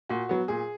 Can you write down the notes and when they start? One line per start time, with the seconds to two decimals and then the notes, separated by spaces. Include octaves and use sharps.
0.09 A#2 F#4
0.29 F#3 B3
0.48 A#2 G#4